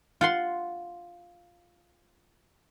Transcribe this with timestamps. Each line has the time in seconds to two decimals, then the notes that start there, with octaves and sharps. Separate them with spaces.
0.21 F4 F#5 C6